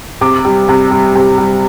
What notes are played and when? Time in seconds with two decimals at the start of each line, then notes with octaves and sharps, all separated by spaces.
0.21 C3 D6
0.45 G3
0.69 C3
0.91 G3
1.15 C3
1.38 G3